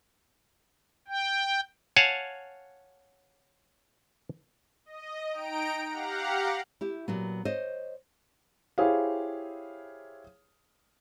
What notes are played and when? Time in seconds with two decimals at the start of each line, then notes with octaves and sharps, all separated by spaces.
1.08 G5
1.96 C#5 F5 F#5 G#5 A5
4.86 D#5
5.30 D#4 G5 A#5 D7
5.89 G4 F5 F#5 A#5
6.81 E4 G4
7.08 A#2 F#3 B3
7.45 C5 C#5 D#5
8.78 E4 G4 G#4 C5 C#5 F5